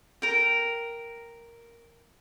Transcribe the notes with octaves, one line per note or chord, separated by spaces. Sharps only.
A#4 G5